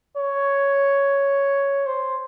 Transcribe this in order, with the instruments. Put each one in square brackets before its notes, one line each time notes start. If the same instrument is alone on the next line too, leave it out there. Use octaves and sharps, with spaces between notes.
[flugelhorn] C#5
C5